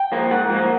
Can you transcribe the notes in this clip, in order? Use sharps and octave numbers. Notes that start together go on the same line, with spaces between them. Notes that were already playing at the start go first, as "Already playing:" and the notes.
Already playing: G5
F3 A#3
G#2 F#5
F3 A#3